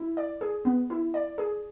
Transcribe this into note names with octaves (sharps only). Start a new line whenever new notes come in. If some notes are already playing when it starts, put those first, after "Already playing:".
Already playing: E4
D5
G#4
B3
E4
D5
G#4